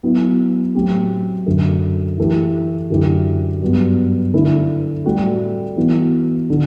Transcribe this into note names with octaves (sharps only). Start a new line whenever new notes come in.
F#3 B3 E4
A2 F#3 C4 G4
F#2 D3 A3
E3 A3 E4 G4
F#2 D3 A3 E4 G4
G2 F#3 B3
D3 A3 E4
A2 G3 C4 F#4 A4
E3 B3 F#4
D3